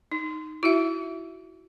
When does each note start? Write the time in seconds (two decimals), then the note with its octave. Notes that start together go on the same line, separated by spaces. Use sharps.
0.12 D#4
0.63 E4 F#4 E5